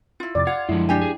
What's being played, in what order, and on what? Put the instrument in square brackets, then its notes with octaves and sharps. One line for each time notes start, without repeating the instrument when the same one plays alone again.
[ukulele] E4 F4
[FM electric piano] F2 C3 A6 [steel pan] D5
[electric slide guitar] F4 [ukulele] F#5 [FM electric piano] G#6
[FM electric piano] F#2 F3 [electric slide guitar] D3 G#3 [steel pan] E4
[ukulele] D4 G4 G#5
[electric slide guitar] G#4